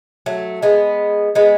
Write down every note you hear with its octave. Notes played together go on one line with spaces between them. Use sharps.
F#3 A3
G#3 B3
G#3 B3